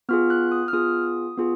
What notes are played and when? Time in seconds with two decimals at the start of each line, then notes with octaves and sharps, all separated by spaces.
0.09 B3 F4 G#4 F6
0.30 F#6
0.52 D#6
0.68 F6
0.73 B3 F4 G#4 D#6
1.38 B3 F4 G#4